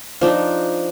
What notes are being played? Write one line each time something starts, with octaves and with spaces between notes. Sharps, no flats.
F3 D4 D#4